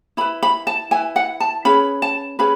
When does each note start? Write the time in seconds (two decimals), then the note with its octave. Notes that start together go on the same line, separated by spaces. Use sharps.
0.17 E4 B5
0.21 B4
0.43 B5
0.67 A5
0.91 E4 B4 G#5
1.16 F#5
1.40 A5
1.65 C#4 G#4 B4 B5
2.02 A5
2.39 C#4 G#4 B4 B5